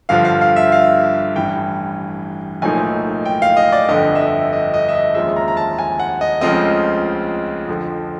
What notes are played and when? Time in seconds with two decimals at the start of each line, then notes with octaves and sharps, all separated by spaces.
0.09 G1 G2 D3 F3 F5
0.25 F5
0.41 F5
0.56 E5
0.72 F5
1.36 A1 G2 E3 G5
2.62 B1 A2 F3 A#3 D#4 G#5
3.25 G5
3.42 F5
3.57 D#5
3.72 D5
3.89 G1 F2 D3 D#5
4.15 E5
4.21 D#5
4.53 D#5
4.74 D#5
4.89 E5
4.95 D#5
5.15 D#2 C#3 F3 G#3 E5
5.36 A#5
5.48 A#5
5.57 A5
5.78 G#5
6.00 F#5
6.21 D#5
6.41 C#2 C#3 F3 A3 C4 D#5
7.68 F2 D3 F3